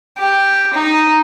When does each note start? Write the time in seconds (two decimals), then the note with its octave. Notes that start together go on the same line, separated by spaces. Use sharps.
0.18 G4
0.74 D#4